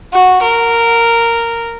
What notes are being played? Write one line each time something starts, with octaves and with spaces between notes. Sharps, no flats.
F#4
A#4